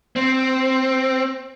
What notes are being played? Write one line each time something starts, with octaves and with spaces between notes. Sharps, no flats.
C4